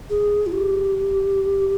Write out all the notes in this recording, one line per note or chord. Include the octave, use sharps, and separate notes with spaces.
G#4
F4
G4